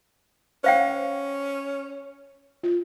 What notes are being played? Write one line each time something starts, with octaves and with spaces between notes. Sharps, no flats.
C#4 C5 F5 G5
F4